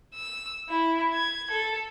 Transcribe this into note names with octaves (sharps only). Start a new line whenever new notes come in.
E6
E4
G#6
A4